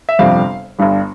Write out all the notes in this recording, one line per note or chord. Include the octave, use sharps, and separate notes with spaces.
E5
G1 F2 C3 G3 C4 F5
G1 G2 G3